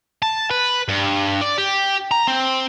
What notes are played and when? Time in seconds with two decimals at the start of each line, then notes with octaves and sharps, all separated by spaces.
0.22 A5
0.51 B4
0.89 G2
1.42 D5
1.58 G4
2.11 A#5
2.28 C4